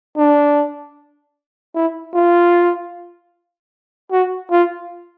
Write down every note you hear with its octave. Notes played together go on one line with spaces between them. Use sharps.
D4
E4
F4
F#4
F4